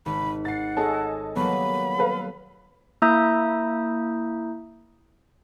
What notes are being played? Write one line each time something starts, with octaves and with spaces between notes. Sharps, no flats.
G#1 B5
F#5 A6 C7
G#4 A4 C#5 D#5 G#5 A5
F#3 G3 A#3 B3 B5
A4 B4 F5
A#3 E4 E5 A#5 D#6 G6